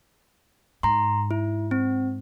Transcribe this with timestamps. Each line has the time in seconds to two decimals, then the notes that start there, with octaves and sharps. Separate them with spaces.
0.83 G#2 A#5 C6
1.31 E4
1.71 C4